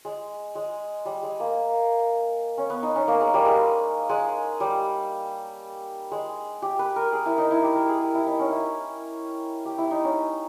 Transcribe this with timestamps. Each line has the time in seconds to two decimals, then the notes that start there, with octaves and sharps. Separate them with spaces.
0.05 G#3
0.55 G#3
1.05 G3
1.23 G#3
1.40 A#3
2.58 C#4
2.70 B3
2.83 D#4
2.96 C#4
3.08 A#3
3.21 G#3
3.34 G3
3.46 G#3
4.09 G#3
4.60 G3
6.12 G#3
6.62 G4
6.79 B4
6.96 A#4
7.12 G#4
7.26 E4
7.38 D#4
7.51 E4
7.63 G4
7.76 A#4
7.88 G#4
8.01 G4
8.14 E4
8.26 D#4
8.39 C#4
8.52 E4
9.65 G4
9.78 E4
9.91 D#4
10.04 C#4